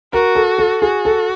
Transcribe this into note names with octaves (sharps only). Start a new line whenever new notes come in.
F#4 A#4
A4
A4
F#4 G#4
A4